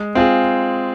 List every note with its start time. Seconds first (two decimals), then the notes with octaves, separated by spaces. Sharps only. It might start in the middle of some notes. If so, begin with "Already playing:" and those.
Already playing: G#3
0.15 C4 F4 G#4